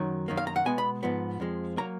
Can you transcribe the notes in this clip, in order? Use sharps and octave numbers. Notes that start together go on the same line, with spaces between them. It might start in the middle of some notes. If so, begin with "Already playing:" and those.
Already playing: F#2 D#3 F#3
F#2 D#3 A#3
F5
A#5
F#5
B2 G#3 B3 G#5
B5
G#2 F3 B3
F2 F3 G#3
F#3 A#3 A#5